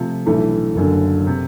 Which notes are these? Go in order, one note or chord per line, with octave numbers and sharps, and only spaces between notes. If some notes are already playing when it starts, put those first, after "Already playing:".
Already playing: C3 F3 A3
B1 A2 E3 A3 D4
F#1 F#2 D3
C3